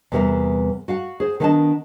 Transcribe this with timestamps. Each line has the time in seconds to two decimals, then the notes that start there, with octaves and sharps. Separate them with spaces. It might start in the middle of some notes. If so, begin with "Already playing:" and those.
0.12 E2 C3 G3 B3 A#4 E5
0.88 F#4 F5 F#5
1.20 G#4 C5
1.40 D#3 B3 D4 C5 D#5 A5